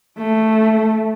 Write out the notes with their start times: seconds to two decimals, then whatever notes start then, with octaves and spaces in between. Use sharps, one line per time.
0.18 A3